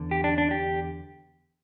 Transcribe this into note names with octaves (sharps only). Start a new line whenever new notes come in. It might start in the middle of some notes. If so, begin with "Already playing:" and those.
Already playing: E2 D3
G4
D4
D4
G4